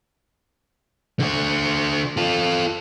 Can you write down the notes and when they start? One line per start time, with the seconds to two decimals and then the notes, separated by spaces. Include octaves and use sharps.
1.20 D3 F#4
2.17 F4 A4